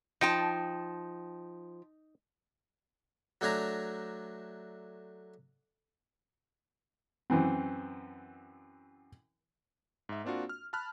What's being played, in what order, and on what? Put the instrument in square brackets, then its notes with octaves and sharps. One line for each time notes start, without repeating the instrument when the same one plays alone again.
[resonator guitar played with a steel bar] F3 G5 A5 [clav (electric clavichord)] D#4
[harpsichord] F#3 A3 D4 G#5 A#5
[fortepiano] F#2 E3 C4
[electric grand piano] G#2 E5
A#3 C4 D4 F4 F#4
F6
A5 B5 F6 F#6